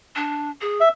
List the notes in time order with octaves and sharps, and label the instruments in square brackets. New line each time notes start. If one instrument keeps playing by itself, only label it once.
[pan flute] D4
G#4
[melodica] E5